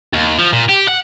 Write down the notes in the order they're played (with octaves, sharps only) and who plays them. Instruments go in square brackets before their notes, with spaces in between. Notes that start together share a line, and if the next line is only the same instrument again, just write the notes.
[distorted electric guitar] D#2
F3
A#2
G4
F#5